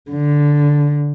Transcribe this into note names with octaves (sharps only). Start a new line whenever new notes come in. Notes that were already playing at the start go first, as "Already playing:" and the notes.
D3